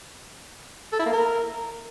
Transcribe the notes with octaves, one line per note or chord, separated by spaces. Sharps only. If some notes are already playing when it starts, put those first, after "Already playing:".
A4
E4
A#3
A#4